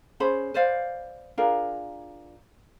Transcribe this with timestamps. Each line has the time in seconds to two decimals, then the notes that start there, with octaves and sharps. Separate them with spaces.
0.20 C#4 G#4 C5 B5
0.54 B4 C5 D5 F5
1.38 D4 F4 G#4 A#4